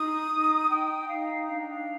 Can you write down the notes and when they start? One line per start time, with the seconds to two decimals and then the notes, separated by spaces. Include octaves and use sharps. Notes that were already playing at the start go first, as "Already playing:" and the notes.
Already playing: D#4 D#6
0.31 D#4
0.70 D#4 G5
1.08 D#4 F5
1.48 D4 F5
1.59 G5
1.70 F5